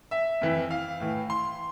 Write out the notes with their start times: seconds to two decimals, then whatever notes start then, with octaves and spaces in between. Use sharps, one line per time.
0.11 E5
0.41 F2 E3
0.71 F5
1.00 A2 E3
1.30 C6